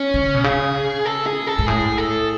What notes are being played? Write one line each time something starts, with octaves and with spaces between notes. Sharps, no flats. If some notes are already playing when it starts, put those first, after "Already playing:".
Already playing: C#4
C#3
B2
C#3 G#4
A4
G#4
A4
G#2
A2 G#4
A4